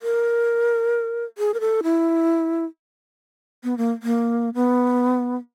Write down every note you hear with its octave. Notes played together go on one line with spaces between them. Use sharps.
A#4
G#4
A#4
A4
E4
B3
A#3
A#3
B3